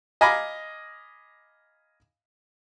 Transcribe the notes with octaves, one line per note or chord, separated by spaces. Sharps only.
D#5 F5 G#5 A#5 B5 D6